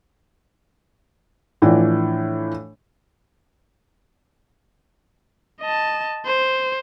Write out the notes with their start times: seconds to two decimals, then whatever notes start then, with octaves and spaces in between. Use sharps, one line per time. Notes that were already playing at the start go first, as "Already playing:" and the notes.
1.62 A2 E3 F3 D4
5.61 D#5 A5
6.26 C5